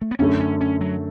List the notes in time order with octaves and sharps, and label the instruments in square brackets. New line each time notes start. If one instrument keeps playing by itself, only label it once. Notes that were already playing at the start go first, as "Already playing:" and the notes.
[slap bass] A3
B3
[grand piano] F#2 D3 A3 [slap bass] C#4
[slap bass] C#4
C#4
F#3